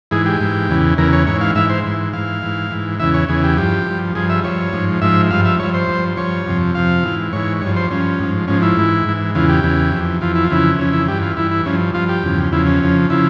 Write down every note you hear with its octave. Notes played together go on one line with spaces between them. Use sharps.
G#2 E3 G#4
G4
G#2 E3
E2 C#3 E3
E2 C#3 E3 A#4
C#5
G#2 E3 C#5
F5
G#2 E3 E5
C5
G#2 E3
G#2 E3 F5
G#2 E3
G#2 E3
E2 C#3 E3 E5
C#5
E2 C#3 E3 G#4
G4
G2 F3 G4
G2 F3
G2 F3 G#4
E5
G2 F3 C#5
G#2 F3
G#2 F3 E5
G2 F3 F5
E5
G2 F3 C#5
C5
G2 F3
G2 F3 C#5
F2 C3 F3
F2 C3 F3 F5
G#2 E3
G#2 E3 C#5
G2 F3 C#5
C5
G2 F3 C#4
G#2 F3
G#2 F3 C#4
E4
G#2 E3
G#2 E3
E2 C#3 E3 F4
G4
E2 C#3 E3
F2 E3
F2 E3 F4
E4
F4
F2 C#3 E3 E4
F2 C#3 E3 C#4
E4
G2 E3 G4
F4
G2 E3 E4
E4
G2 F3 C#4
G2 F3 F4
G4
E2 C#3 F3
E2 C#3 F3 E4
C#4
F2 C#3 F3
C#3 F3 E4